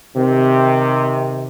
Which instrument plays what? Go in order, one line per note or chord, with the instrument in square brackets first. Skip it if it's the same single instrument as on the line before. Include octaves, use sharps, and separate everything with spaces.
[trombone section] C3 D#3